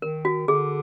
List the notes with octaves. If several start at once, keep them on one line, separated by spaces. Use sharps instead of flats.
D#3 A#4
F#4
D3 G#4